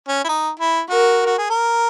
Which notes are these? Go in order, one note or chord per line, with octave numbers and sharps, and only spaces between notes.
C#4
E4
D#4
E4
F#4 A#4
F#4
G#4
A#4